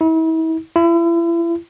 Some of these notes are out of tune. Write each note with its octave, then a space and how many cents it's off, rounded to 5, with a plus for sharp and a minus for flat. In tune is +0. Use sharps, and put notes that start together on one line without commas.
E4 -40
E4 +35